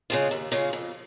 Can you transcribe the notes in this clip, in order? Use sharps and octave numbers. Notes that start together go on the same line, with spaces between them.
C#3 G#3 F4
D#2
C#3 G#3 F4
F2